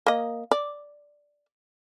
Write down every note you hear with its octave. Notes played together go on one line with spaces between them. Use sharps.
A#3 D#5
D5